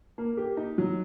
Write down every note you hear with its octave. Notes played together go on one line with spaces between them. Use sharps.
A#3
G4
D#4
F#3